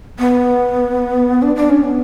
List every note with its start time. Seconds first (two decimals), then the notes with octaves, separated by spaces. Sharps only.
0.19 B3
1.42 D4
1.56 D4
1.69 C#4
1.83 B3